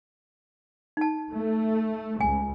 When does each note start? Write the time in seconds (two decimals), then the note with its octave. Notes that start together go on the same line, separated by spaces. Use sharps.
0.97 D#4 A5
1.31 A3
2.21 C#2 G#5